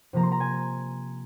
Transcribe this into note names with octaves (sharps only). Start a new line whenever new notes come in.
C3 F3 A#3 A#5
C6
A#5
G#5